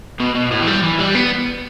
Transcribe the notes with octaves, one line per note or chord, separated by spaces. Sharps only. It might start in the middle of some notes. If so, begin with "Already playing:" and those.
B2
B2
A2
E3
G3
E3
G3
B3